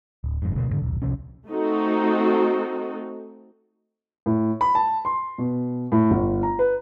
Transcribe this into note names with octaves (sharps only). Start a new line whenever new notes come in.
D1
F#1 F2 G#2
D2 B2 G3 A#3
D2 G#2 D3
D#1 B1
C2 C3 F3 C#4
A3 C4 D#4 F#4 A4
A2
B5
A5
C6
B2
A2
G1
A#5
B4